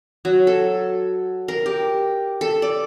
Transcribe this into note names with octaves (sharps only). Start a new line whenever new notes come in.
F#3
A4
A#4
G4
A4
D5